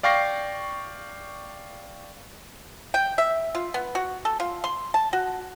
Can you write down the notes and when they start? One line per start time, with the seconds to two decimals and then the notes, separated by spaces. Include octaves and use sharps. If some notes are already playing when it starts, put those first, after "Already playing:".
0.03 D5 F5 G5 C#6 A#6 C7
2.94 G5
3.18 E5
3.55 F4
3.74 B3
3.95 F#4
4.25 A4
4.40 F4
4.64 C6
4.94 A5
5.13 F#4